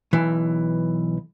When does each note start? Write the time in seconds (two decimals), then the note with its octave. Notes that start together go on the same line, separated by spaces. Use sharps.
0.13 B1 E3